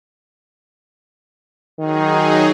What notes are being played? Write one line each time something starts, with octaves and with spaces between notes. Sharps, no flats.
D#3 F#3 D#4 G#4